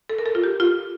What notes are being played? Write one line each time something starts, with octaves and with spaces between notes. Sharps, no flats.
A4
A#4
A4
F4
G4
F4